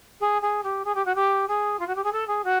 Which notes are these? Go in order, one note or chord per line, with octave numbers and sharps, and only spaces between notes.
G#4
G#4
G4
G#4
G4
F#4
G4
G#4
F4
F#4
G4
G#4
A4
G#4
F#4